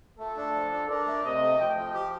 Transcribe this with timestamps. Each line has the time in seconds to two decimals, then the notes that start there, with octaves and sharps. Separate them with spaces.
0.19 A3 F4 A4
0.37 D4
0.55 F3
0.72 D4
0.89 D4 A#4 D5
1.07 A3
1.24 C3 C5 D#5
1.41 A3
1.59 F3 D#5 G5
1.78 F3
1.94 G4